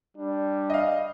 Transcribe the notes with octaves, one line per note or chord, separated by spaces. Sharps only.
G3 D4
D#5 F5